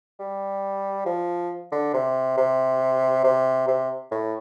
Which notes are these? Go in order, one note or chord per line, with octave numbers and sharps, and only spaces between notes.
G3
F3
D3
C3
C3
C3
C3
A2